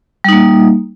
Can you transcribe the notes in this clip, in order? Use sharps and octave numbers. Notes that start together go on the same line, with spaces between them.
G3 A#3 D#4